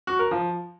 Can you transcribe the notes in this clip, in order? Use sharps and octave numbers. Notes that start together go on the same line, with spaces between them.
F#4
A#4
F3